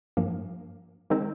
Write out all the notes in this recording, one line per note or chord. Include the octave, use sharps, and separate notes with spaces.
G2 F3 A#3
D#3 G#3 C4 D#4